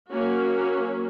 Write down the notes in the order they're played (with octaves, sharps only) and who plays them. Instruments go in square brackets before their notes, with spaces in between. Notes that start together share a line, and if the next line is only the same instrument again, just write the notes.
[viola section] F#3 A#3 C#4 F#4